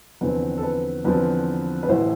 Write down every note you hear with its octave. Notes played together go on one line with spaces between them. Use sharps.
E2 D3 F3 C4 B4
A4
B4
E2 D3 F3 C4 B4
B4
A1 A2 E3 C5